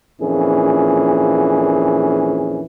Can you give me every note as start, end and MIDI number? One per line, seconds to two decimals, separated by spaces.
0.21 2.63 34
0.21 2.63 41
0.21 2.63 46
0.21 2.63 52
0.21 2.63 61
0.21 2.63 68